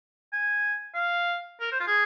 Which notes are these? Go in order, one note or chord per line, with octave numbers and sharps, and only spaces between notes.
G#5
F5
A#4
C5
F4
G#4